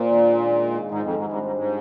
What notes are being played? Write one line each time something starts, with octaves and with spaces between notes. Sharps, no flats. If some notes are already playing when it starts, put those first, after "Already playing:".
Already playing: A#2 C4 F4
D#3 G#3 D4
D#3 G#3 D#4
G#2 D#3 G#3 D#4
F2
G#2
G#2 C3 G3 D4
G#2
G#2